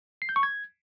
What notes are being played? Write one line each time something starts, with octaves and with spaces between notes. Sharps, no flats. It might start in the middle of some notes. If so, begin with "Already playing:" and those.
C7
G6
C#6
G#6